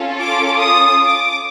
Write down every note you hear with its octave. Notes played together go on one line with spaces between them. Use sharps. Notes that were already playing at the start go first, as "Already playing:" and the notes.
Already playing: C#4 F4 A4
D6
D#6
D6